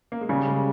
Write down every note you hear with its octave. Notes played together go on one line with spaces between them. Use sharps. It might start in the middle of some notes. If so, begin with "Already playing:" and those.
A#3
G#3
C#3 G3
G#3